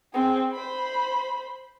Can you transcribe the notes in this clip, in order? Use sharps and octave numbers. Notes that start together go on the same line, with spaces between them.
C4 G#4
C5 B5